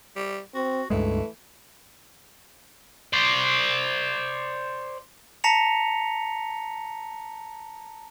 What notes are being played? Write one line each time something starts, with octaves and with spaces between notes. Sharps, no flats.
G3
C4 F#4
C#2 G2 E3 G#3 A3
C5 D5
A5 A#5 A#6 B6 C#7 F7